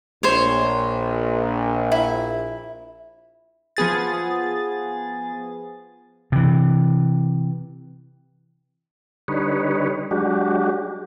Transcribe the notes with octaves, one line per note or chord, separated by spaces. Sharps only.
A#1 C5 C#5
E4
F3 B3 G#4 A6
C3 E3
D3 G3 D#4 B4 C#5
F#3 G#3 D4 F#4 G4